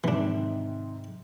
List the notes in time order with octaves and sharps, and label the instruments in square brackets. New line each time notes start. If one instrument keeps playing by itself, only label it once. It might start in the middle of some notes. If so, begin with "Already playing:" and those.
[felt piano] G#2 C3 D#3 [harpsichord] E3 D4